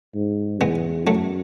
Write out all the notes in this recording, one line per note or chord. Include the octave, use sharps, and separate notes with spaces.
G#2
E2 G#3 B3
F#2 F#3 A3